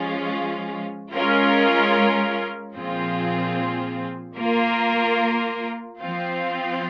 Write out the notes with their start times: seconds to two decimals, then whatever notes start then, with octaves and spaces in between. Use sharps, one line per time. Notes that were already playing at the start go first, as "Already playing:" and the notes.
Already playing: F3 G#3 C#4 F4
1.14 G#3 C#4 F4 A#4
2.76 A#2 F3 C4 F4 G#4
4.37 A#3 F4 A#4
6.00 F3 C4 F4